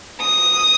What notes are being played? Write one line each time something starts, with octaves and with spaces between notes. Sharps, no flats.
D#6